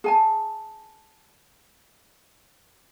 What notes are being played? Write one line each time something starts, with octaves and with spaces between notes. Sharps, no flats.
G#4 G#5 A5